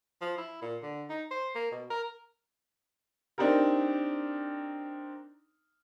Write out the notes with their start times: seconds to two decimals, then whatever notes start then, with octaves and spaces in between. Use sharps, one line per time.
0.21 F3
0.38 E4
0.62 A#2
0.82 D3
1.09 D#4
1.31 C5
1.55 A#3
1.71 B2
1.90 A#4
3.38 C4 D4 D#4 G4 A#4